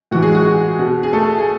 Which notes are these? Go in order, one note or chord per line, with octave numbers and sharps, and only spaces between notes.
A2 E3 F#4
G#3 G#4
F#4
F#4
B2
G#4
A3 A4
G#4